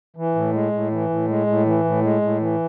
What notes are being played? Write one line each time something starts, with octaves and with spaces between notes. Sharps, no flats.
E3
A2
G#3
A2
E3
A2
G#3
A2
E3
A2
G#3
A2
E3